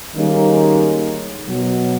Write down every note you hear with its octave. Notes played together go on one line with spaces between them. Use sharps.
D#3 G3 G#3 A#3 C#4 D#4
B2 F#3